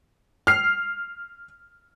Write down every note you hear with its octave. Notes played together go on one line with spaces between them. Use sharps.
F6 C7